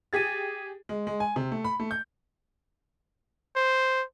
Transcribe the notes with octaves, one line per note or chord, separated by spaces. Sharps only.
G4 G#4 G#6 A6 B6 D#7
G#3
G#3
G#5
C3
A3
B5
A3
G6
C5